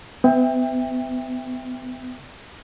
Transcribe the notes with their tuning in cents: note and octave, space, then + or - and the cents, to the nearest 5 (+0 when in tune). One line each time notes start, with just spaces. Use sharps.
B3 +40 E5 -5 G5 +25